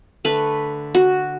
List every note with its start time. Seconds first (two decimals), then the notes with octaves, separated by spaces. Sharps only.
0.25 D3 A3 B4
0.95 F#4